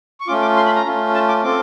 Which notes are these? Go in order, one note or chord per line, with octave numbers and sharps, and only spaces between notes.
C#6
A3 C#4 F4 D6
D6
C6
B5
A#5
A3 C#4 F4
A5
D6
C4 F4 A4 D6